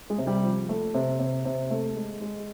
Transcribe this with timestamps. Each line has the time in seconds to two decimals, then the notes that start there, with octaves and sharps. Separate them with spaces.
0.10 G#3
0.18 C3
0.27 G3
0.43 F3
0.69 A3
0.94 C3
1.19 C3
1.45 C3
1.70 A3
1.96 G#3
2.21 G#3